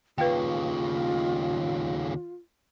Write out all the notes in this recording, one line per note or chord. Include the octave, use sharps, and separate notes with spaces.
D#2 C#3 F4 B4 F5 G5